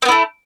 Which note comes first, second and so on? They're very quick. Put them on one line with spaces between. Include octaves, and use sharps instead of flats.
C4 B3 E4 A3